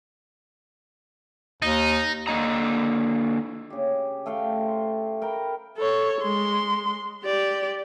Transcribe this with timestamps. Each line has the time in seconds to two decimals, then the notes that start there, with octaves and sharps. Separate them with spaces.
1.62 D#2 D#4
2.28 D3 A#3 D#5 A#5
3.70 C#3 G4
4.26 A3 A4 F5 G5
4.60 C5
5.22 A#4 G5 A#5 B5
5.78 A4 C#5
6.22 G#3 C6
7.24 G4 D5